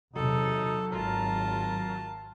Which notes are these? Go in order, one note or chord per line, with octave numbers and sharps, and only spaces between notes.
E2 C3 F#3 D#4 A4
G#1 F4 A#4 A5